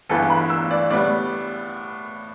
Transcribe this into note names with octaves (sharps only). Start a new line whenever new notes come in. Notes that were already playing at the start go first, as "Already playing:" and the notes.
G1 G2 E3 B3 A4
B5
E6
D5
A2 G3 B3 D5